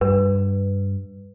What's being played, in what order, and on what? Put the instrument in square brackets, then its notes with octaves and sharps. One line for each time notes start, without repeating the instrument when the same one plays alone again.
[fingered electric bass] G2 [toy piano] B4